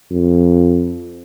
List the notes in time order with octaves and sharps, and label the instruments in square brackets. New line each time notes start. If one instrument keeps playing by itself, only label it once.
[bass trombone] F2